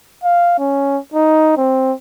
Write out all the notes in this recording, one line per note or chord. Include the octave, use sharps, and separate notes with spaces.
F5
C#4
D#4
C4